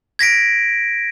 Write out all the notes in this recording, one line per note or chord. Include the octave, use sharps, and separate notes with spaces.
G#6 A#6 B6 D7